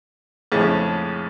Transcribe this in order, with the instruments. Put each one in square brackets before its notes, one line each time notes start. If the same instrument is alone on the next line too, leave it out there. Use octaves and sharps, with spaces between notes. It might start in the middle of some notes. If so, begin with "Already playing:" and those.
[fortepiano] A#1 F2 A2 C#3 G#3